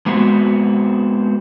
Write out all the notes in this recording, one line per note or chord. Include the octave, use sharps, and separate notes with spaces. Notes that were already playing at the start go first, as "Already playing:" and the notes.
G#3 B3 C4 F#4